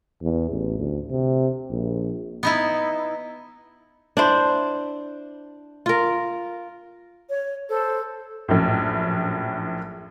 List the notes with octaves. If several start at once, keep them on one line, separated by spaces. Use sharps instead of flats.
E2
A1
D2
C3
A#1
B3 D#4 E4
D4 E4 C5
F4 A#4
C#5
A4 C5
A#1 F#2 A2